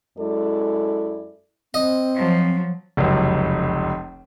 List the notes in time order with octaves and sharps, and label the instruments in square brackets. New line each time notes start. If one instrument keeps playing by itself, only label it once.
[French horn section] F#2 G#3 E4 A4 D5
[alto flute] C4 [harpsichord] D#5
[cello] F3 F#3
[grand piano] F1 C#2 F#2